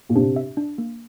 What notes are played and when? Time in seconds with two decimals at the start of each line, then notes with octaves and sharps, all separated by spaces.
0.09 A#2
0.15 C3 D4
0.36 E5
0.57 D4
0.78 A#3